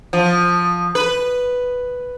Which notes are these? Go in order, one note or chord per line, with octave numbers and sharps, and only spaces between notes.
F3
B4